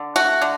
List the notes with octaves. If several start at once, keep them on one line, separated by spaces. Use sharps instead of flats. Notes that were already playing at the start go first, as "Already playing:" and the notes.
Already playing: D3
A3 F#4
D3